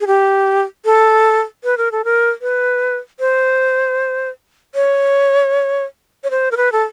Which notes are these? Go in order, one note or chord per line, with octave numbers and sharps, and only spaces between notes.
G#4
G4
A4
B4
A#4
A4
A#4
B4
C5
C#5
C#5
C5
A#4
B4
A4